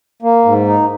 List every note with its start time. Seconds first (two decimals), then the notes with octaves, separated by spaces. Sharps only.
0.22 A#3
0.45 G#2
0.67 D#4